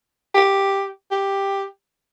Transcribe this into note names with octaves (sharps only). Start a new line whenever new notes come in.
G4
G4